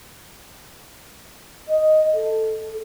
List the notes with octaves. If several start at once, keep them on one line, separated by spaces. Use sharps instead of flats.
D#5
A4